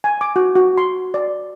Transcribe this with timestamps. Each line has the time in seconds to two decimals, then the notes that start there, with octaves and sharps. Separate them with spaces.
0.04 G#5
0.21 D6
0.36 F#4
0.55 F#4
0.78 C6
1.14 D5